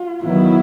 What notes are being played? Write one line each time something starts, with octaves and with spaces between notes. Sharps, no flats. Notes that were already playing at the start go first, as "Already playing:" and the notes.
Already playing: F4
D#3 F#3 B3 E4